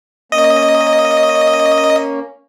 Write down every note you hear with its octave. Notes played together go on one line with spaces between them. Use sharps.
A#3 C#4 D#5